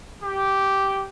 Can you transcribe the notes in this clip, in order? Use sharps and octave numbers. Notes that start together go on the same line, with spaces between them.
G4